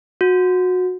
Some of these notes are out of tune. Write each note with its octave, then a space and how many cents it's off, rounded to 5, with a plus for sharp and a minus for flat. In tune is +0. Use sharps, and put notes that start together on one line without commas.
F#4 -20